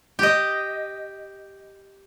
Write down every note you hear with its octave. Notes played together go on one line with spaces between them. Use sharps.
G4 D#5